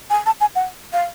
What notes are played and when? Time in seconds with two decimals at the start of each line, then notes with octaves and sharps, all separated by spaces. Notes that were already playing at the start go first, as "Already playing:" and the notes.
0.10 G#5
0.26 A5
0.41 G#5
0.56 F#5
0.93 F5